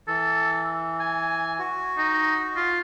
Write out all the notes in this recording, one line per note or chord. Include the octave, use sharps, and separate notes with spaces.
E3 A4
G#5
F#4
D#4
F4